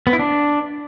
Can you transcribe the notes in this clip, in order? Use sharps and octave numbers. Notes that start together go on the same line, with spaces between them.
B3
E4
D4